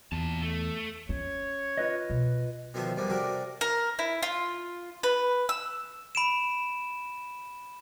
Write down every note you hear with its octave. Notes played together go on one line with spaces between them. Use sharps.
E2 A#2 A5
A3
C#4 C#5
F4 B4 D#5
B2
B2 D3 D#3 F3 C5 E5
E2 F3 G3 G#3 A#3
C3 D4 F#4 G4 A4 A#4
A#4
E4
F4
B4
E6
B5 D7 E7